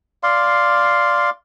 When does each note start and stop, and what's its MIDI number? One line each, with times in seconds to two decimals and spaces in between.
0.23 1.30 74
0.23 1.30 77
0.23 1.30 84